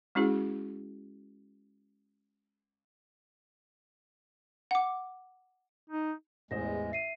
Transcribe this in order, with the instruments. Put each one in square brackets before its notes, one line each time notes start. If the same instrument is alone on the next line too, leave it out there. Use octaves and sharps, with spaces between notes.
[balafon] G#3 C#4 E4 F#4 G#4
[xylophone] F#5 D6
[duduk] D#4
[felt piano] A1 C5 D#5 [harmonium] E2 G#3 [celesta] A#6
[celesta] E5 C7 D#7